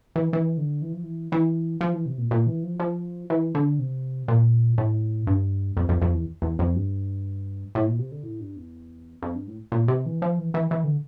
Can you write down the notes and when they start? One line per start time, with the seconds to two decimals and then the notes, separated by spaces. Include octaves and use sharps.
0.16 E3
0.33 E3
0.57 D3
0.82 E3
0.93 F3
1.03 E3
1.32 E3
1.81 F3
1.93 E3
2.06 C3
2.18 A#2
2.31 A#2
2.47 E3
2.63 F3
2.80 F3
3.30 E3
3.55 D3
3.79 C3
4.28 A#2
4.78 A2
5.27 G2
5.77 F2
5.89 F2
6.02 F2
6.14 E2
6.42 E2
6.59 F2
6.76 G2
7.75 A2
7.87 A#2
7.99 C3
8.11 D3
8.23 A2
8.40 G2
8.56 E2
9.23 F2
9.35 G2
9.47 A2
9.72 A#2
9.88 C3
10.06 E3
10.22 F3
10.38 E3
10.54 E3
10.71 E3
10.84 D3